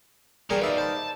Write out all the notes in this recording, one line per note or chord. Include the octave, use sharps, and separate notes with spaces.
B2 F3 G3 G#4 A#4
D#4 B4 D5 E5 F5
C5 A5 B5